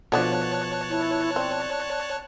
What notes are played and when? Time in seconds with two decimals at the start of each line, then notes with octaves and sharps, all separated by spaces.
0.12 B2 D3 F3 B3 C#5 D5 A5 F#6
0.90 E4
1.36 C4 D5